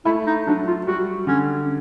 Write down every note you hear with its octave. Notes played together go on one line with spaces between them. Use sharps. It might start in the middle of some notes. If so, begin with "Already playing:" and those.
A3 E4
D#4
F#3 D4
F4
G3 F#4
D3 C#4